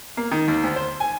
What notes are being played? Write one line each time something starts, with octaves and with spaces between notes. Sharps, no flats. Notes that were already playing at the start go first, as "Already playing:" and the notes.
A#3
D#3
D#2
D2
C5
G#5